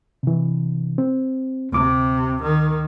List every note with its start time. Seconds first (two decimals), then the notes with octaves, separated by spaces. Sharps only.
0.23 C3 E3
0.98 C4
1.72 D2 C3 D6
2.42 D#3